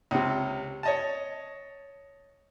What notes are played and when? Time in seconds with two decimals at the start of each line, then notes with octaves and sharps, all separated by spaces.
0.11 C#2 C3
0.83 C#5 D#5 A5